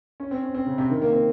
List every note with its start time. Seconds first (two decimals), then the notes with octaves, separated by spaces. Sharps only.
0.20 C#4
0.31 C4
0.43 C#4
0.55 C4
0.66 C#3
0.78 C3
0.90 D#3
1.02 A#3
1.12 C4